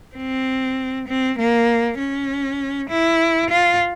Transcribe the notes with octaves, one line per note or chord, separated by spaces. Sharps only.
C4
C4
A#3
C#4
E4
F4